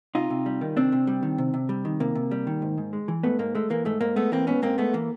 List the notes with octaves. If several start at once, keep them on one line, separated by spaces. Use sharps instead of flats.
C3 D#4 F4
C3
G3
D#3
C3 C4 D4
C3
G3
D#3
C3
C3
G3
D#3
C3 A#3
C3
G3
D#3
G#2
G#2
G#3
E3
G#2 A3 B3
G#2 A#3
G#3 A3
E3 A#3
G#2 A3
G#2 A#3
G#3 A3 B3
E3 A#3 C4
G#2 B3 C#4
G#2 A#3 C4
G#3 A3 B3
E3 A#3